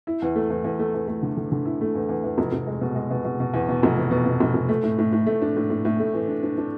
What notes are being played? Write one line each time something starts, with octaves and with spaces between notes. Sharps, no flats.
E4
E2
A3
E2
E2
A3
E2
A3
D3
D3
D3
E4
A3
E2
E2
E2
F1
F1
G#3
B2
G#3
B2
B2
B2
E2
B2
F1
E2
B2
B2
F1
F1
A3
A2
A2
A2
A3
D4
A2
A2
A2
A3
E3
D4
D4
D4